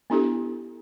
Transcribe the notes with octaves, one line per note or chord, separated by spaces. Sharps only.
B3 D4 E4 G4 A4